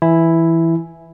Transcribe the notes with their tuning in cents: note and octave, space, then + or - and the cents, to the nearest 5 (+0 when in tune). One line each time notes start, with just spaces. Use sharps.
E3 +0 E4 +0 G#5 +0